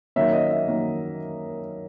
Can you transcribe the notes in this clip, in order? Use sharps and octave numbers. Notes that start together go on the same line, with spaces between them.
D#3 F#3 A#3 C#4 E5
D#5
E5
D#3 F#3 A#3 C#4